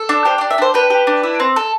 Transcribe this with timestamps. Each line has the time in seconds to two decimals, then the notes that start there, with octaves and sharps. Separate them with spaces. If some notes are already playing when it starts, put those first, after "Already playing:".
Already playing: A4
0.09 D4
0.25 G4 C5
0.38 D4 D5
0.51 E5
0.58 D4 C5
0.74 G4 B4
0.90 G4
1.07 D4
1.23 E4
1.40 C4
1.56 A4